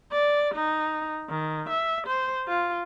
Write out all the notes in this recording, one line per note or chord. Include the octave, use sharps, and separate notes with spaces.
D5
D#4
D#3
E5
C5
F4